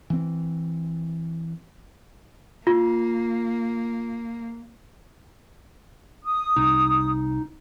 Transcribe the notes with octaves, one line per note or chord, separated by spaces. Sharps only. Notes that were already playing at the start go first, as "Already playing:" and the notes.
E3 C4
A#3 F4
D#6
C2 C3 D#4